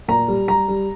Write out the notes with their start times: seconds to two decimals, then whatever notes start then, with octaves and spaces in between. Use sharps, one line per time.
0.08 A#2 A#5
0.28 G3
0.48 G3 A#5
0.68 G3